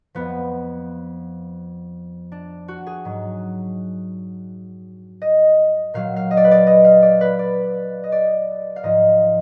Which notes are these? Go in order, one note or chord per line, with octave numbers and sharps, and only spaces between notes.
F2 F3 B3
D4
F#4
G#4
G#2 F#3
D#5
A#2 F#3 F5
F5
D#5
D5
B4
D5
D#5
F5
D5
B4
D5
D#5
D5
F5
G#2 F3 D#5